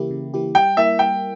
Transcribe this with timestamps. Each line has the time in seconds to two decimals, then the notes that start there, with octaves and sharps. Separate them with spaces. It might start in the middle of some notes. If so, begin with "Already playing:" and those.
Already playing: C#3 E3 A#3 E4 G4
0.11 C#3
0.34 E3 A#3 E4 G4
0.55 G3 G5
0.77 A#3 E4 A#4 E5
0.99 G3 G5